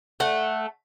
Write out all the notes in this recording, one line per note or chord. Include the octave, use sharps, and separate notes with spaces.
A3 F#5